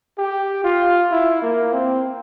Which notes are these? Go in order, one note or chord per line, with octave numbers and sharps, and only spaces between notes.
G4
F4
E4
A#3
C4